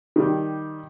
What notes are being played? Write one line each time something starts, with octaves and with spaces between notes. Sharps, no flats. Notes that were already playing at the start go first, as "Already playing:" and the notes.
D#3 G3